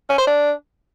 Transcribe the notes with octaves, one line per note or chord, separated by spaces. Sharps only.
C#4
C5
D4